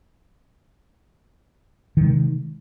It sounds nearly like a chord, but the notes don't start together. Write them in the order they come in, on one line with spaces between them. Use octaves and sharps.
D#3 C3 G#3